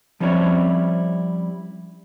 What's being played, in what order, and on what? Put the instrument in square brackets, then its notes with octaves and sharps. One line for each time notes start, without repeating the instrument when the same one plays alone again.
[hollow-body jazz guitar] F3 G3 C4 C#4 E4 C#5